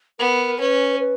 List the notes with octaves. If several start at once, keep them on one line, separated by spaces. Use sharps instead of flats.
B3 A#4
C#4 B4
B4